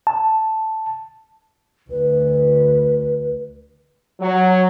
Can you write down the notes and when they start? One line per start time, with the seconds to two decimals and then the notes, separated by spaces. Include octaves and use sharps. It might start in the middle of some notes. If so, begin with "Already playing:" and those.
0.07 A5
1.90 D2 B4
4.20 F#3